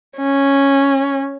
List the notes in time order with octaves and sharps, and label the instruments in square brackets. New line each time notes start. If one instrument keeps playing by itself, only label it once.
[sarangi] C#4